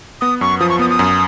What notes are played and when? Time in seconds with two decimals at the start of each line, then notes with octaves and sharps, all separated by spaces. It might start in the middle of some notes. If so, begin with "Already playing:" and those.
0.21 B3 D#6
0.41 F#2 C#6
0.60 F3 D#6
0.70 C#6
0.79 B3 D#6
0.90 D#6
0.99 F#2